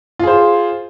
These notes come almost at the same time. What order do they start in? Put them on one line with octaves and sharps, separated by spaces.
F4 G#4 C5